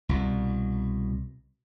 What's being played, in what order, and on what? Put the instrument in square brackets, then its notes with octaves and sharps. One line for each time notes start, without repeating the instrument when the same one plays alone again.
[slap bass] C2 B2